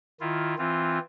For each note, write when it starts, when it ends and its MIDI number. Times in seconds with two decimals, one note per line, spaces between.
0.21 0.55 51
0.21 0.55 64
0.21 0.55 65
0.58 0.99 52
0.58 0.99 60
0.58 0.99 65